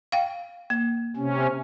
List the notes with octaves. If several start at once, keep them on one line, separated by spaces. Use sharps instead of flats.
F5 G5
A#3
C3 C#4